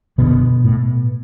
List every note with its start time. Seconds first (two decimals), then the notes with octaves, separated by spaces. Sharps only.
0.18 F#1 F#2 B2 D3 B3
0.64 A2